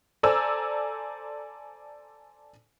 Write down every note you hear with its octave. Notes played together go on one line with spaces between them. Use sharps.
A4 C5 D5 G#5 A#5 E6